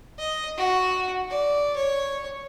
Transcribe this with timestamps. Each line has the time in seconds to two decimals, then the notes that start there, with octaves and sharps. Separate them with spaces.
0.19 D#5
0.58 F#4
1.30 D5
1.76 C#5